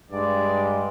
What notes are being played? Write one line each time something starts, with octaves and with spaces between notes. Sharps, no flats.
G2 G#3 D5